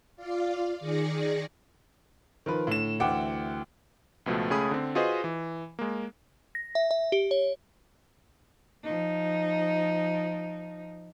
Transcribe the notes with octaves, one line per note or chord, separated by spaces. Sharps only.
F4 D5 F5
D#3 G#4 D5 A#6 C#7
D#3 F3 B4
A2 D3 E7
D2 E3 F#5 G5 D6
C#2 B2 F3 A3
C#2 A3 C#4 G#4 B5 D#6
D3 C4
F4 F#4 G#4 B4 C5 D#5
E3
G#3 A#3
A#6
E5
E5
G4
C#5
F3 D#4